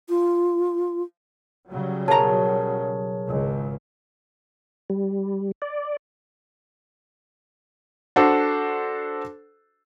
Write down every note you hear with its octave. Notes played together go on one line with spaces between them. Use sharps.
F4
C#3 F#3 G3
B1 G#4 A#4 C#5 A5 A#5
G#1 C#2
G3
D5
D4 F#4 A4 C5